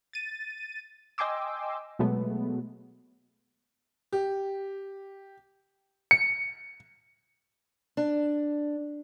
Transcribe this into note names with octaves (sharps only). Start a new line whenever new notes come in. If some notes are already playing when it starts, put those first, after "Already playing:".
A6 D#7
D#5 G5 G#5 C6 D6 E6
B2 F#3 G#3 A3 B3
G4
C#7
D4